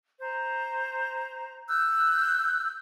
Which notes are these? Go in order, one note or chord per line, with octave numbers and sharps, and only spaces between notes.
C5 A#5
E6 F#6 G6